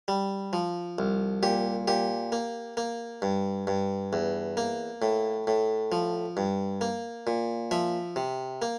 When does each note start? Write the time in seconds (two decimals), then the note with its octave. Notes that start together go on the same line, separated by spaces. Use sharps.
0.08 G3
0.53 F3
0.98 C2
1.43 A#2 G4
1.88 A#2 G4
2.32 A#3
2.77 A#3
3.22 G2
3.67 G2
4.13 E2
4.57 A#3
5.02 A2
5.47 A2
5.92 F3
6.37 G2
6.81 A#3
7.27 A#2
7.71 F3 E5
8.16 C3
8.62 A#3